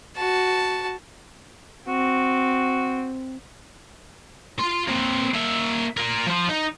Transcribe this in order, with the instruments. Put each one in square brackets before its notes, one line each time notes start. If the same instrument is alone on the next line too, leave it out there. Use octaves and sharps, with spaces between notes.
[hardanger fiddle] F#4 A5
[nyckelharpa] C4 [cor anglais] F#4
[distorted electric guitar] F4 C6
A#3 C4
A#3 E5
F4 A#4
F3 F4
D#4